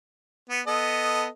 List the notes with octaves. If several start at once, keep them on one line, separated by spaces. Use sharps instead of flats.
B3
B3 A4 D#5